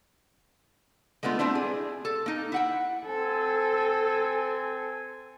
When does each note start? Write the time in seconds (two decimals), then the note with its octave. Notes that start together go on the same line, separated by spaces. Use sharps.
1.23 G#3 A3 B3 D4 F4
1.39 G3 A3 C4 D4 E4
1.55 G#4
2.05 A4
2.26 A#3 D#4
2.52 E4 F#5 G5
3.05 C4 A4 G#5